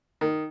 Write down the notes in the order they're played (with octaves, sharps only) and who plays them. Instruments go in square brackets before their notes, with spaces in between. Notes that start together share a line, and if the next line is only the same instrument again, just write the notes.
[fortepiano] D#3